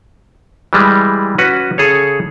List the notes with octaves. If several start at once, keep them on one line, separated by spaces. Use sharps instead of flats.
E3 G3 G#3
C#4 F#4 B4
C#3 G#4 A4 C#5